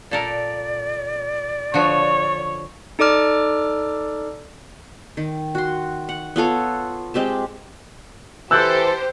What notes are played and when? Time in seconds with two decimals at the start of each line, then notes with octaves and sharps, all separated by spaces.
0.11 A#2 A4 A#4 D5
1.74 D3 F3 F#4 C#5
2.99 D#4 A4 D5 D6 F6
5.17 D#3
5.55 F#4 C6
6.09 F#5
6.36 B3 F4 A4 C#5
7.14 G#3 C4 G4 A5
8.51 E3 G4 A4 C5 E6 F#6 G6